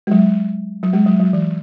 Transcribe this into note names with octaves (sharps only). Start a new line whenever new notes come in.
G#3
F#3
F#3
G#3
F#3
F#3
E3